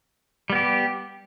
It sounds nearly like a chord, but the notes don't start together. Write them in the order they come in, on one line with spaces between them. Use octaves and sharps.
G3 B3 G4